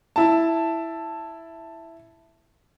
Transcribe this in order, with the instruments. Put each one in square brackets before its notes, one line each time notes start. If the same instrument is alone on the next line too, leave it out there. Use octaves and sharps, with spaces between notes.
[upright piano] E4 A5